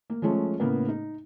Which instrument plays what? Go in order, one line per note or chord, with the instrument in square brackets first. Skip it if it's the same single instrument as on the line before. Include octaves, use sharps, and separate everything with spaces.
[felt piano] A#3
F3 G#3 A3 C#4
A2 C#3 A#3 B3
D#4